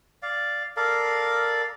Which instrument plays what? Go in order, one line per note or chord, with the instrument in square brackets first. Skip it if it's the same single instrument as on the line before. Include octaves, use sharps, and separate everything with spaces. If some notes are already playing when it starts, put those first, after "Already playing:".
[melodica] D5 F5
A4 A#4 D5 F5